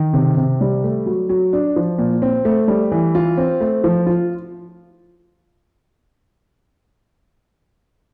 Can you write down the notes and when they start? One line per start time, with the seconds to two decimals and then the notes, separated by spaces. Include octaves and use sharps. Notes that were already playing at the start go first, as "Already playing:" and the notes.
Already playing: D#3
0.13 C3
0.37 C3
0.61 G3
0.84 A3
1.06 F#3
1.29 F#3
1.53 D4
1.76 F3
1.98 A#2
2.22 C4
2.45 A3
2.68 G3
2.92 E3
3.15 F4
3.37 C4
3.61 A3
3.84 F3
4.07 F4